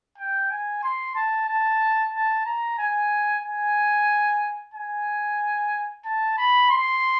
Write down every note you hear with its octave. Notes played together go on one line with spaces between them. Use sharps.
G5
G#5
C6
A5
A5
A5
A#5
G#5
G#5
G#5
A5
B5
C6